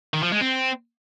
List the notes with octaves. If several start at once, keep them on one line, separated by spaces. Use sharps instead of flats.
D#3
F3
G#3
C4